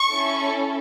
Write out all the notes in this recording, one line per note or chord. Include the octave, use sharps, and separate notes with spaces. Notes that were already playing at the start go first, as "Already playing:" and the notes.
Already playing: C#6
C#4 E4 A4